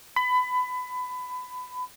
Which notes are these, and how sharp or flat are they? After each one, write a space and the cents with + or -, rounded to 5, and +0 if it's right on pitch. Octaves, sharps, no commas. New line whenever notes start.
B5 +25